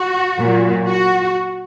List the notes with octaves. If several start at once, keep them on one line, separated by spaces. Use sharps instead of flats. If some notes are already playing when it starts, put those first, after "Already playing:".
Already playing: F#4
A#2 F#3
F#4